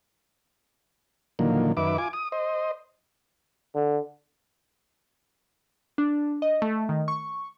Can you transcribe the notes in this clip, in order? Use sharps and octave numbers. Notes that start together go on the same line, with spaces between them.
A#2 D3 D#3 F3 F#3 A#3
F#2 D#3 B4 E5 D6
F4 G#5 D6
D#6
C5 D#5
D3
D4
D#5
A3
D#3
C#6